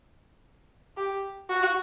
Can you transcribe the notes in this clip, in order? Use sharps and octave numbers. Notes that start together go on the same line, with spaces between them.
G4
F#4